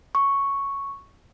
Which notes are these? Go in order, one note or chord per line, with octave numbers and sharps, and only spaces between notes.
C#6